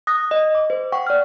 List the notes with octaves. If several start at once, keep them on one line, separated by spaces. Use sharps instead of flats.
D#6 F#6 A#6
D#5
D6
C5
F#5 G5 C#6
D5 F6